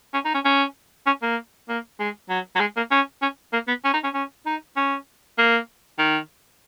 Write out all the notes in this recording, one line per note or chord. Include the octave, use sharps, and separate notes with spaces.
C#4
D#4
C#4
C#4
C#4
A#3
A#3
G#3
F#3
F#3
G#3
A#3
C#4
C#4
A#3
B3
C#4
D#4
C#4
C#4
D#4
C#4
A#3
D#3